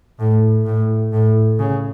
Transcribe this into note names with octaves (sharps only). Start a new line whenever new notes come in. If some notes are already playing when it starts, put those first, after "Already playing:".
A2
A2
A2
C#3